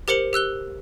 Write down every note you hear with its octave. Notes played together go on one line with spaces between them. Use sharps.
G4 A#4 C5 C#7 F#7
G4 E6 F#6 G7